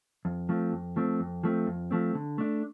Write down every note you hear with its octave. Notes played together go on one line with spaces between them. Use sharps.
F2
F3 A3 C4
F2
F3 A3 C4
F2
F3 A3 C4
F2
F3 A3 C4
D3
A3 D4